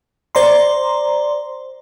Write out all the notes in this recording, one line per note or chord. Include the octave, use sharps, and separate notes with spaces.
C5 D5 A#5 C6